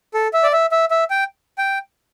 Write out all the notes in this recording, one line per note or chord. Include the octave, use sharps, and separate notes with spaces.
A4
E5
D5
E5
E5
E5
G5
G5